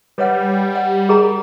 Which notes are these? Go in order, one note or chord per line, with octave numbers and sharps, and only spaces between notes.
G3 B4 C#5 F#5
F#5
G#4 A#4 A#5